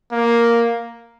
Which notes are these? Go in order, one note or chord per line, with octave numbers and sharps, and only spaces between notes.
A#3